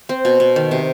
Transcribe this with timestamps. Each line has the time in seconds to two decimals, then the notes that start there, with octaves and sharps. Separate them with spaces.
0.09 C4
0.25 B2
0.40 B2
0.56 D#3
0.71 C3